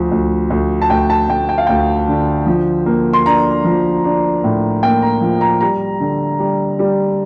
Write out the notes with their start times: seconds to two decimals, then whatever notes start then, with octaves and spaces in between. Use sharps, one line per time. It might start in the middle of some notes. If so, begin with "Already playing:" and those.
Already playing: D2 F3
0.11 D2
0.50 D2
0.82 A5
0.90 D2 G5
1.10 A5
1.29 D2 G5
1.49 G5
1.58 F5
1.67 D2 G5
2.08 D3
2.46 F3
2.86 A#3
3.13 C6
3.26 D4 A#5
3.65 F3
4.04 D4
4.44 A2
4.83 A#3 G5
5.02 A#5
5.21 F3
5.41 A#5
5.61 G3 A#5
6.00 D3
6.39 G3
6.79 G3